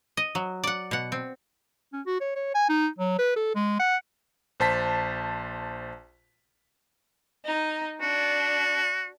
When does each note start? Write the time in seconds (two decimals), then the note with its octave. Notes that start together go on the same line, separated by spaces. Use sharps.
0.17 D#5
0.35 F#3
0.64 D5 F#5
0.91 B2 F#5
1.12 C4
1.93 C#4
2.06 F#4
2.21 C#5
2.35 C#5
2.55 G#5
2.69 D#4
2.98 F#3
3.19 B4
3.36 A4
3.55 G#3
3.79 F#5
4.60 A#1 C5 A5 B6
7.43 D#4
8.01 D4 F#4